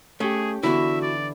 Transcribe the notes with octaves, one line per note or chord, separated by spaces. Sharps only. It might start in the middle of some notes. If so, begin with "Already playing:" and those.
A3 C#4 G4 G#4
D3 E3 B3 E4 F#4 E5
D5